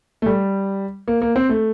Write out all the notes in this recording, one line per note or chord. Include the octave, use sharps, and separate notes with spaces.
A3
G3
A#3
A#3
C4
A3